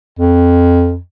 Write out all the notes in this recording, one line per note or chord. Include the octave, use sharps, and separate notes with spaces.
F2